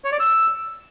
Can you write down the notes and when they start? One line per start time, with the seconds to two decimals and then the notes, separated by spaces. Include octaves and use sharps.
0.04 C#5
0.12 D5
0.20 E6